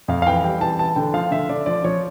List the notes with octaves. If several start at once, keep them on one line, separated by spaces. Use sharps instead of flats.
F2 F5
F5
E3 G5
G3 G5
E3 A5
E3 A5
D3 G5
F3 F5
D3 E5
D3 D5
F3 D5
F3 C#5